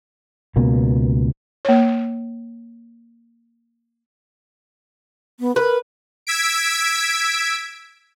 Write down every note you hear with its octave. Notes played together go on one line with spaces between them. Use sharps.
C#2 B2 A#3
A#3 C#5
B3
A#4 B4
E6 G#6 B6 D7